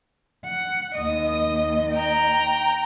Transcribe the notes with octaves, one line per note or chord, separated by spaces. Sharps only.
F#5
D#2 D#5 D#6
G5 A#5